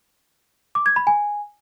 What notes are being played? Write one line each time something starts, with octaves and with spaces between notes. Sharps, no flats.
D6
G#6
B5
G#5